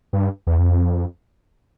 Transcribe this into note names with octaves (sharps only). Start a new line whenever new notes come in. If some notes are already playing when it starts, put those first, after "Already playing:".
G2
E2
F2